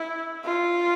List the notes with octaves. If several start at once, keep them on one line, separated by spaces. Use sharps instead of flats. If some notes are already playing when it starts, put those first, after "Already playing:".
Already playing: E4
F4